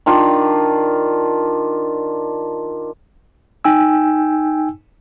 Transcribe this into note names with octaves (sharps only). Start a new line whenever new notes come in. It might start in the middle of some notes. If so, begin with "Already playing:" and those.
D#3 D4 F4
D#4 G5 G#5 E6